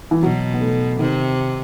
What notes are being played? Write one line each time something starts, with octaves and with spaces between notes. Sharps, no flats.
E3
B2 F#3
B3
A3
C3 D#3